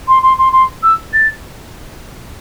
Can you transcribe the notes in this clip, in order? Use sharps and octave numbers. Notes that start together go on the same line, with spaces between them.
C6
C6
C6
C6
E6
A6